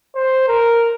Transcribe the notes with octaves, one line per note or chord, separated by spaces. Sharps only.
C5
A#4